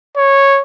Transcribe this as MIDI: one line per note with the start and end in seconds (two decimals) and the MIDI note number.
0.17 0.62 73